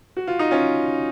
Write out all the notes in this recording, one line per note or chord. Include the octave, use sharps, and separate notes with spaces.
F#4
F4
D#4
C#4 F4